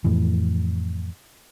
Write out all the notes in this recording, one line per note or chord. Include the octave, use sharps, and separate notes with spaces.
F2 A2 E3